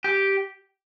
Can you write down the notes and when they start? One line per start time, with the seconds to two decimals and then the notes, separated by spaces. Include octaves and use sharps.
0.04 G4